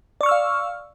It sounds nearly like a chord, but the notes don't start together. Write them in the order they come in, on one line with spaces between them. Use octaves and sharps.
D5 C#6 F6 E6 F5